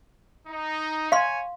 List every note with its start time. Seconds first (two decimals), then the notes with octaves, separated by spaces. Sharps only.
0.47 D#4
1.12 C#5 F5 G#5 C6